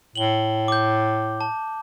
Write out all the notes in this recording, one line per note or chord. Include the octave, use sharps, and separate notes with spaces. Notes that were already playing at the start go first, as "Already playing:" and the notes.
A2 F#7 G7
D6 G6
A5